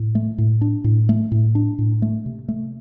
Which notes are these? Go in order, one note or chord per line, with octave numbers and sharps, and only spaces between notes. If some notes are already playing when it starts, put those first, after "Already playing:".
Already playing: A2
A3
A2
D4
A2
A3
A2
D4
A2
A3
C3
A3